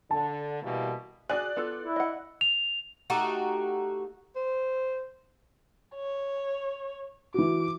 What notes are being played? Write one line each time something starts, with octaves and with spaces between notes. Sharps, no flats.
D3 A5
B2 E3 G3 A#3
F#4 G#4 D5 G#5 F#6
B3 F4 A4
E4
D#5 F#5
F7
A3 D#4 F#4 G4
C5
C#5
E3 F#4 D6